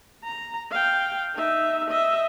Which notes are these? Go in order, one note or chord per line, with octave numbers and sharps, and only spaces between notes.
A#5
F5 G5
D#4 E5
D#5 E5